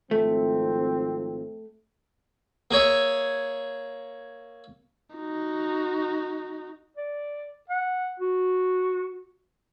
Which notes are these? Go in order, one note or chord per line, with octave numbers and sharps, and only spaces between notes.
G#1 F3 A3 C4
A#3 G#4 C#5 E5
D#4 F#4
D5
F#5
F#4